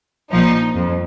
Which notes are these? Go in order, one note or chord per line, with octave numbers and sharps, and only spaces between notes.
A#1 A#2 F3 D#4
F2